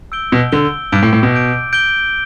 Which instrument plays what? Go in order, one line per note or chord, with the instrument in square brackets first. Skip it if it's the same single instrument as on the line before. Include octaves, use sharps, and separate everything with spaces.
[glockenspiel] E6 G6 D7 G7
[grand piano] B2
[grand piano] D3 [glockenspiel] E6 G6 D7 G7
[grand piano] G2 [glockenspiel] D6 G6 D7
[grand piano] A2
A2
B2
[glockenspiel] D6 G6 D7
G6 D7 G7